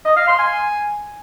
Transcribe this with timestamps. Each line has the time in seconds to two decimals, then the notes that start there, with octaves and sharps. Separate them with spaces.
0.05 D#5
0.16 F5
0.28 C6
0.39 G#5